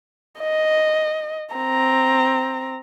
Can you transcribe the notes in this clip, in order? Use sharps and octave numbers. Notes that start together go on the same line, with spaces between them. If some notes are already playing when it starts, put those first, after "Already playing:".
D#5
C4 A#5